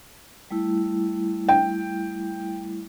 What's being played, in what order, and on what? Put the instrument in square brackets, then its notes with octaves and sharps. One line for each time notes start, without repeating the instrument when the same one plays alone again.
[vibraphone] G3 A3 E4
[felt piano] G5